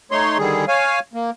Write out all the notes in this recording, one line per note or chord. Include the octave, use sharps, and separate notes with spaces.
A3 D#4 C#5 C6
D3 D#3 G3 G#4
C#5 F5 G#5
A#3